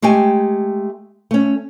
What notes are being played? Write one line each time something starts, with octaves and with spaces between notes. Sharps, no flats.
G#3 A3 G4 G5 G#5
A3 C#4